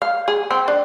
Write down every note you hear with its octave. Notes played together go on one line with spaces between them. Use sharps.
F5
G#4
C4
D4